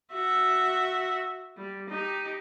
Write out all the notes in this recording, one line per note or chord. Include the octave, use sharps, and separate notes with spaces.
F#4 E5
G3
D#4 G4